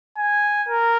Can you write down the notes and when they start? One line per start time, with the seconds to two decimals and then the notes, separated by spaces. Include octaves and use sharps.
0.18 G#5
0.68 A#4